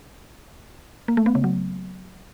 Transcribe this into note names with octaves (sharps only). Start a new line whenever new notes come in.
A#3
A3
B3
C#3
F#3